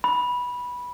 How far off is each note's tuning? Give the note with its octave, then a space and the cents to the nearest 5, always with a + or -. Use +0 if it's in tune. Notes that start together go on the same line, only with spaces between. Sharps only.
B5 -10